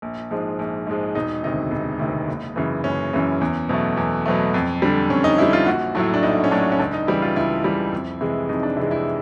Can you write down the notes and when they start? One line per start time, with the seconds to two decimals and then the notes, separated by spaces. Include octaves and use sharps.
0.02 A#1
0.31 G#2 F3 G#3
0.59 A#1
0.87 G#2 F3 G#3
1.15 E1 D#4
1.43 D2 C3 D#3 D#4
1.71 E1
1.99 D2 C3 D#3
2.28 F#1
2.56 F#2 C#3 E3
2.84 F#1 C#4
3.13 F#2 C#3 E3
3.41 E2
3.69 B2 F#3 A3
3.97 E2
4.26 B2 F#3 A3
4.54 F2
4.82 D3 G3
5.10 F2 C#4
5.24 D#4
5.38 D3 G3 E4
5.53 F4
5.67 A#1 F#4
5.95 A2 F#3 A3 E4
6.14 D4
6.23 A#1 D#4
6.44 C#4
6.51 A2 F#3 A3 D4
6.72 C#4
6.79 C#2 D4
6.93 D#4
7.07 C#3 E3 G3 E4
7.22 F4
7.36 C#2 E4
7.64 C#3 E3 G3
7.93 F2
8.21 C3 E3 G#3
8.49 F2 D#4
8.63 D4
8.77 C3 E3 G#3
8.91 E4